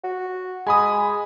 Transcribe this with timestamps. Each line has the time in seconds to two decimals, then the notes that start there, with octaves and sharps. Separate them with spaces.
0.04 F#4
0.67 G#3 G#5 B5 D#6